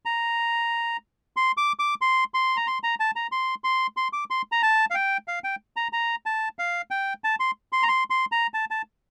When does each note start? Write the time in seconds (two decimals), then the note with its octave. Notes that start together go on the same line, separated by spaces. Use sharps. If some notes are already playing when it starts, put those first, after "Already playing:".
0.05 A#5
1.36 C6
1.57 D6
1.79 D6
2.01 C6
2.34 C6
2.57 A#5
2.67 C6
2.83 A#5
3.00 A5
3.16 A#5
3.32 C6
3.64 C6
3.97 C6
4.13 D6
4.30 C6
4.52 A#5
4.63 A5
4.90 F5
4.95 G5
5.28 F5
5.44 G5
5.76 A#5
5.93 A#5
6.26 A5
6.59 F5
6.91 G5
7.24 A5
7.40 C6
7.72 C6
7.83 A#5
7.88 C6
8.10 C6
8.32 A#5
8.54 A5
8.71 A5